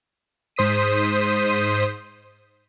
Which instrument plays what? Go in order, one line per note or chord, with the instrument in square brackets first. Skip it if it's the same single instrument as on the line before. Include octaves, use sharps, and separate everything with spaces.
[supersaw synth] G#2 C5 D#6 B6 D#7